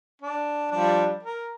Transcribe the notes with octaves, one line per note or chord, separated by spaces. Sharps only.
D4
F3 G3 D4
A#4